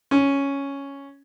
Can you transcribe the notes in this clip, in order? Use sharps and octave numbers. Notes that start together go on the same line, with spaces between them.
C#4